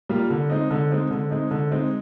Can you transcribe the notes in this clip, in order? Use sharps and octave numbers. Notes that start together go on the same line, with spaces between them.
G3 A#3 F4
D3
G#3 C4 D#4
D3
G#3 C4 D#4
D3
G#3 C4 D#4
D3
G#3 C4 D#4